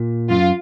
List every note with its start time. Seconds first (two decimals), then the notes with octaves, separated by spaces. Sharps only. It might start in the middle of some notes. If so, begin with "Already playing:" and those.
Already playing: A#2
0.30 F#2 F4